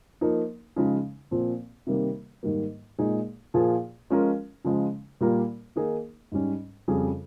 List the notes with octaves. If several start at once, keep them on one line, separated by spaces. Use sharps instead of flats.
F3 A#3 D#4
C#3 F3 G#3 D#4
A#2 F3 C4
C3 D#3 G3 A#3
G#2 D#3 G3 A#3
A#2 G#3 D#4 G#4
A#2 F3 A#3 F4 G#4
F3 G#3 C#4 F4 A#4
C#3 F3 G#3
A#2 G3 A#3 F4 A#4
D#3 A#3 D#4 G#4
G#2 G3 C#4
F2 C#3 G3 C#4 G#4